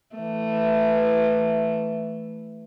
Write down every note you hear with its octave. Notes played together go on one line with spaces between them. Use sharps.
E3 A3